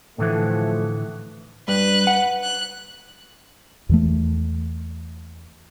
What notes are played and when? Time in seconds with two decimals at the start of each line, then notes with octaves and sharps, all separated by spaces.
0.18 A2 D3 E3 F3 A3
1.68 G2 B4 F#6
2.07 F#5
2.43 F#6
3.89 E2 E3 A3